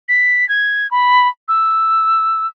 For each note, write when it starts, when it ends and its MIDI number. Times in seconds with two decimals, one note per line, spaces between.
0.08 0.47 95
0.49 0.90 92
0.91 1.28 83
1.48 2.47 88